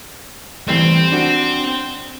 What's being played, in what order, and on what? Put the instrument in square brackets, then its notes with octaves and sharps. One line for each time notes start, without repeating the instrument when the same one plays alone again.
[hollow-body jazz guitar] E3 G3 A3 [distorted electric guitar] C4
[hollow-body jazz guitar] D4 F#4